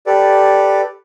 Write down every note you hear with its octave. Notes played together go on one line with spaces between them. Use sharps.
G4 A4 B4 D5